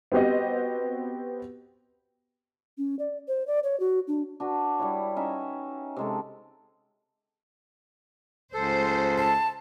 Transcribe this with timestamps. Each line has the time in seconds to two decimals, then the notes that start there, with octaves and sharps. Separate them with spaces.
0.12 B3 C4 F#4 G4 D#5
2.78 C#4
2.99 D5
3.28 C5
3.47 D5
3.64 C#5
3.80 F#4
4.08 D4
4.40 D4 F#4 B4
4.79 G3 E4 C#5
5.17 C#4 D#4 E5
5.97 C3 G#3 A4
8.54 C#2 A4 C5
9.18 A5